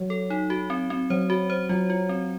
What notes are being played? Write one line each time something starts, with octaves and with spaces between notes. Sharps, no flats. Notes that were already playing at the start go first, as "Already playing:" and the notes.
Already playing: F#3
A4
D#4
F#4
C4
C4
F#3 C5
F#4
C5
F#3 F4
F4
C4